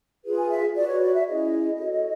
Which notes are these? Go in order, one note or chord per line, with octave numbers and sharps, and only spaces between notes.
F4 G#4 B4
G#5
E5
F#4 B4 D5
C#5
D5
E5
C#4 E4 G#4 D#5
F#4 A4 C#5